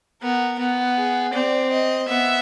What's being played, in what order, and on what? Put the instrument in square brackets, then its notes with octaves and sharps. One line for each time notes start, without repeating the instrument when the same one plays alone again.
[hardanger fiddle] B3 [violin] A#4
[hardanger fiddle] B3
[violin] G#4
[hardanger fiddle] C4 [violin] D5
[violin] D#5
[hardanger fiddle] B3 [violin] E5